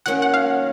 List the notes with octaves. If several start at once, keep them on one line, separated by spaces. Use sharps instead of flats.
D#3 F#3 A#3 C#4 F#5
F#5
F5